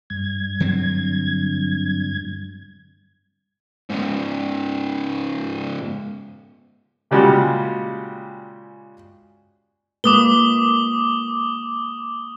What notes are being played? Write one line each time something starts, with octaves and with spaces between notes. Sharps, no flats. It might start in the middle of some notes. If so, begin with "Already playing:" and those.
G2 G#6
D3 F#3 C4
G#2 C#3
A#2 C#3 G3 G#3 F#4 G4
G#3 A#3 B4 D6 D#6 G7